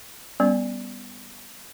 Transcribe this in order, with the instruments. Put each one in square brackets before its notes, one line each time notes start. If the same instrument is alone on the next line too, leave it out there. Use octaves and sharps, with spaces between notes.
[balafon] G3 B3 C#4